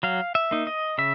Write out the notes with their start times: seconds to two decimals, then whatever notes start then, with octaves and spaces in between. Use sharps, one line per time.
0.03 F#3 F5
0.35 E5
0.51 A#3 D#4
0.67 D#5
0.98 C#3 E5